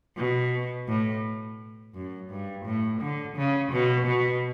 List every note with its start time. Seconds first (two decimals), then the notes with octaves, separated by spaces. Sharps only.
0.17 B2
0.88 A2
1.95 F#2
2.30 G2
2.65 A2
3.01 D3
3.36 C#3
3.72 B2
4.07 B2